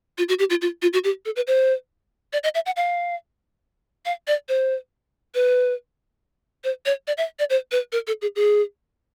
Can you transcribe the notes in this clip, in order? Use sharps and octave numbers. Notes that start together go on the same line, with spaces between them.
F4
F#4
G4
F4
F4
F4
F#4
G4
A4
B4
C5
D5
D#5
E5
F#5
F5
F5
D5
C5
B4
C5
C#5
D5
E5
D5
C5
B4
A#4
A4
G#4
G#4